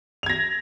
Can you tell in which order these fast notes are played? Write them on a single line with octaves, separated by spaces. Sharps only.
F7 G#6 A#6